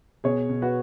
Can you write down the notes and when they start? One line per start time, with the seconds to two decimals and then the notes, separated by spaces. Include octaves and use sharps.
0.24 B2 G#4 C#5
0.49 B2
0.62 F#4 B4